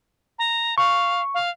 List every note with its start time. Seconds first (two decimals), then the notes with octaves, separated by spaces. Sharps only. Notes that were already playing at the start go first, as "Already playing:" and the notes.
0.39 A#5
0.78 F5 C#6
1.34 F5